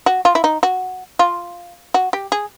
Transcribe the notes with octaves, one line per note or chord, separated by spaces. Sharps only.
F#4
F4
E4
D#4
F#4
F4
F#4
G4
G#4